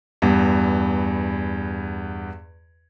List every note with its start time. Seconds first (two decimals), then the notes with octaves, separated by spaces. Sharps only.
0.22 E2 G2